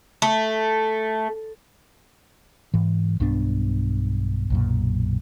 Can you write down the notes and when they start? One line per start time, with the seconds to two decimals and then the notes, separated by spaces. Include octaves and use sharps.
0.22 A3
2.74 G#2 E3
3.20 B1 G2 B3 D4
4.50 B1 F#2 A#2